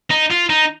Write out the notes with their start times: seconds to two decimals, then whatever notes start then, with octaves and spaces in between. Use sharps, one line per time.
0.11 D#4
0.31 F4
0.50 D#4